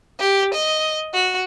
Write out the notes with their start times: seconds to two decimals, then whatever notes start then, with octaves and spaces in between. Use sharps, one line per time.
0.19 G4
0.53 D#5
1.14 F#4